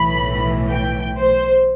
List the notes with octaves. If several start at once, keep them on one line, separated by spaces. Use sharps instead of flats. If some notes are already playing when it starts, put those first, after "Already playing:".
Already playing: B1 A2 E3 B5
G5
C5